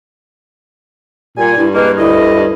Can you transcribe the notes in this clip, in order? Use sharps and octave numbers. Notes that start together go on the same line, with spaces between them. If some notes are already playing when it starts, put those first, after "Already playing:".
A#2 G3 G#5
G2 E4
G#3 A#3 B4
D2 E4 D#5
G2